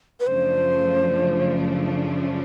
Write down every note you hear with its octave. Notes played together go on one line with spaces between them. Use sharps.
B4
F#2 C#3 F3 A3 D4 C5